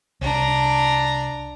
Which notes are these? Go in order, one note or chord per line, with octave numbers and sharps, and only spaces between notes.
C2 D4 A#5